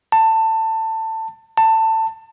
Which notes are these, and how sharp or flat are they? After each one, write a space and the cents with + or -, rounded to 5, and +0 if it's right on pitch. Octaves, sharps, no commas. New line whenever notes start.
A5 +20
A5 +20